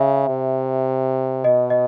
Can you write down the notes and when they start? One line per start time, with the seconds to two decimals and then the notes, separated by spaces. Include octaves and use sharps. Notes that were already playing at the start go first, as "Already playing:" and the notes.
Already playing: C#3 E5
0.28 C3
1.44 B2 D#5
1.70 D#5